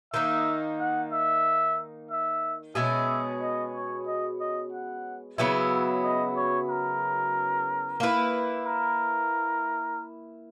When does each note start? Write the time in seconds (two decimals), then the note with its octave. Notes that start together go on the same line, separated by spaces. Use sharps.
0.13 D#3 A#3 D#4 E5
0.80 F#5
1.12 E5
2.11 E5
2.75 B2 G#3 C#4 G#4 E5
3.42 D#5
3.75 C#5
4.06 D#5
4.40 D#5
4.72 F#5
5.38 C#3 F#3 B3 E4 E5
6.04 D#5
6.36 C#5
6.69 A#4
8.00 A#3 E4 B4
8.66 A#4